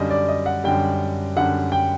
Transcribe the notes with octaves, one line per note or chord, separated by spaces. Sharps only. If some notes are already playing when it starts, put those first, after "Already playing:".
Already playing: F#2 D3 G3 D#5
D5
D#5
F#5
F#2 D3 G3 G5
F#2 D3 G3 F#5
G5